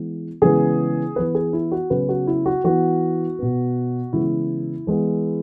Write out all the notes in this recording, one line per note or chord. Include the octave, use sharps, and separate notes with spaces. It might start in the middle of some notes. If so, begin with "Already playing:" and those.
Already playing: E3 G#3 B3
C#3 E3 G#3 B3 G#4
E3 B3 B4
G#4
E4
F#4
C#3 F#3 B3 B4
F#4
E4
F#4
E3 B3 F#4
B2 B3
C#3 E3 G#3 B3 E4
E3 G#3 B3